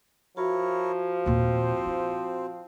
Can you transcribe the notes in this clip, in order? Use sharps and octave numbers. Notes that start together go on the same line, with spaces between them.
F3 E4 F#4 A#4 C#5
D#2 A#2 C4
E4